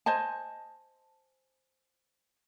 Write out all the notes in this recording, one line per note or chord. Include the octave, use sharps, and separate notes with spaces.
C5 D#5 G#5 A5